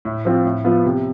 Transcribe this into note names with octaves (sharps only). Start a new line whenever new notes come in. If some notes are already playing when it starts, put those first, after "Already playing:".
A2
F3 C4 F4
A2
F3 B3 F4
C3